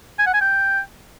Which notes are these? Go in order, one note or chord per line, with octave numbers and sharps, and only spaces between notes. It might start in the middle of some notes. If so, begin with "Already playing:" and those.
G#5
F#5
G#5
G5